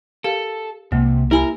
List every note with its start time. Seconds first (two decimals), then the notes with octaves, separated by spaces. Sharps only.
0.24 G4 A4 A#4 F5
0.92 C2 C3 G#3 A#3
1.31 E4 G4 A#4 G#5 B5